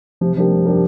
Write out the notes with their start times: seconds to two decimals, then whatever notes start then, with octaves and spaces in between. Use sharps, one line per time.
0.21 C3 F3
0.36 F3 G3 D4 G4 A#4
0.51 C3
0.65 G3 D4 G4 A#4